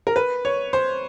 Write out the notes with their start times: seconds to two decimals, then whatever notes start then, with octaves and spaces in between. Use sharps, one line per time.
0.07 A#4
0.16 B4
0.45 C#5
0.73 C5